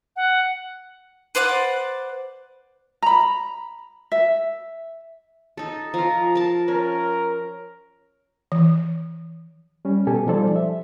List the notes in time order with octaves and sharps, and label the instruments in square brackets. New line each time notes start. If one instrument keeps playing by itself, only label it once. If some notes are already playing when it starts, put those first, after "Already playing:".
[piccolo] F#5
[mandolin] B4 C5 D5 F#5
[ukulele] A#5 B5
E5
[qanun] D#4 A4
[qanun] F3 F4 [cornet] A#5
[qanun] A#4 A5
[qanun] C#4 [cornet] A#4
[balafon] E3
[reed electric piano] G3 C#4
B2 G4 A4 G#5
F3 G3 D#4 A4 C5 D5
E5